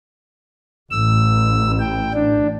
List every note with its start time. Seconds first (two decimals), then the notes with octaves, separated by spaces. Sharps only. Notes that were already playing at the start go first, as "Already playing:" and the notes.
0.91 A1 E6
1.79 G5
2.14 D4